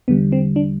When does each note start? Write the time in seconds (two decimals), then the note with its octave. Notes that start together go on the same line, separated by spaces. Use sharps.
0.08 E2 D3 G3 B3
0.32 C4
0.56 D4